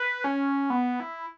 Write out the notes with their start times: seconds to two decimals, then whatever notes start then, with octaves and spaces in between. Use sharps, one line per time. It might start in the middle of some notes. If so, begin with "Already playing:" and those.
Already playing: B4
0.24 C#4
0.70 B3
1.00 E4